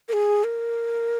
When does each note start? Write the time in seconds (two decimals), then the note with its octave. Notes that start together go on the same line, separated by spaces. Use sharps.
0.09 A#4
0.13 G#4
0.44 A#4